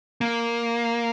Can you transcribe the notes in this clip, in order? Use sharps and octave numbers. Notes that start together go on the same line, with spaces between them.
A#3